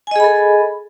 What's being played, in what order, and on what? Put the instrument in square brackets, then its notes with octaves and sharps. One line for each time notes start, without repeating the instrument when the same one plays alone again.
[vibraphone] G#5
D#5
G#4
B5
A4